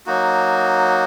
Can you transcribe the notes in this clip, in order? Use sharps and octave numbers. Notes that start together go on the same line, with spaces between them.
F#3 A#3 D#4 F#4